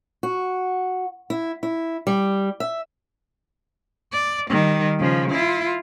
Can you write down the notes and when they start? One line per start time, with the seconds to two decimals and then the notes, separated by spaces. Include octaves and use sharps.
0.23 F#4
1.30 E4
1.63 E4
2.07 G3
2.60 E5
4.13 D5
4.50 D#3 G3
5.00 C#3 F3
5.30 E4 F4